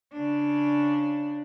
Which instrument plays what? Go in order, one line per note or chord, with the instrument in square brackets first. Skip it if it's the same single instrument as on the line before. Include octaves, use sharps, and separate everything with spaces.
[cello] C#3 D4